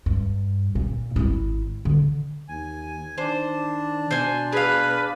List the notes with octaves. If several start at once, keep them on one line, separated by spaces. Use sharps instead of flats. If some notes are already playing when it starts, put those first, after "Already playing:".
G2
A#2
G#1 E4
D3
D#2 G#5
D#3 D4 C5
B2 C5 G#5
G#4 B4 F5